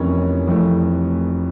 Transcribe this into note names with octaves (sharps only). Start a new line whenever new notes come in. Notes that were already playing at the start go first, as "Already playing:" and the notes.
Already playing: F1 F2 E3 A#3 C#4 C#5
F1 F2 E3 A3